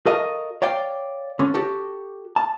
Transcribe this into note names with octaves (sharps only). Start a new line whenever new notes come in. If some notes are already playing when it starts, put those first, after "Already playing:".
F#4 A4 A#4 D#5 F5
C#5 D5 F5 G5
D3 C#4
F#4 G4 A4
A5